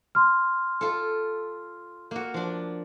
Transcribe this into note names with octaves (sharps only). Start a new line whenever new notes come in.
C6 F6
F4 A4
A#3 F#4
F3 D4